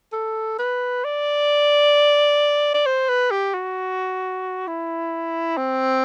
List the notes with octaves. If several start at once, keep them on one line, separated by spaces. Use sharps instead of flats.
A4
B4
D5
D5
C5
B4
G4
F#4
E4
C4